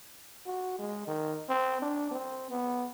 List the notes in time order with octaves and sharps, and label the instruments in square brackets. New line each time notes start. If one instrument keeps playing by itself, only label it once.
[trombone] F#4
G#3
D#3
C4
D4
C4
B3